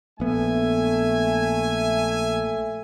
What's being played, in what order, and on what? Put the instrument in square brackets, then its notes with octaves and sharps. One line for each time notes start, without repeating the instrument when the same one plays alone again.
[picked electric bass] A#1 B3 [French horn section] A3 [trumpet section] E5 G#5